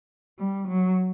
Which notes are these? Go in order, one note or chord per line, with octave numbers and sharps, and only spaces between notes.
G3
F#3